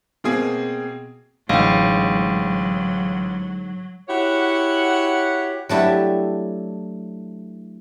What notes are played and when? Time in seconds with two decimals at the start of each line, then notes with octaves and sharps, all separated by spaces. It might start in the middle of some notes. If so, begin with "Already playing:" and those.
0.24 B2 A#3 C4 G#4
1.49 A1 G#2 D3 F#3 G#3 F5 G5
4.09 E4 F#4 G4 C#5 F#5
5.69 F#3 A3 D4 E4 G4